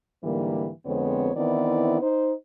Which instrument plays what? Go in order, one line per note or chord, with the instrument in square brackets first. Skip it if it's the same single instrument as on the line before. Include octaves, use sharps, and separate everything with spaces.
[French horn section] G#2 D3 E3 G3 A#3
F2 D3 G#3 B3 C4 C#5
D#3 E3 B3 C4 E4 D5
D#4 C5